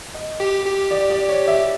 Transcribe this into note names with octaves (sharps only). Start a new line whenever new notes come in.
D#5
G4
G4
D5
D5
C#5
E5